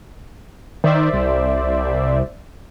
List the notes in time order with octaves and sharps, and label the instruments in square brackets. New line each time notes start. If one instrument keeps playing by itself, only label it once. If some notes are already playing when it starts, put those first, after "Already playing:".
[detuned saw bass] D#3 [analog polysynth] C5 D5 E5
[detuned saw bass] C2